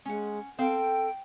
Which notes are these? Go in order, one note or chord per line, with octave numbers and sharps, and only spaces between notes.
G#3 C#4 F#5
C4 A4 F5 G5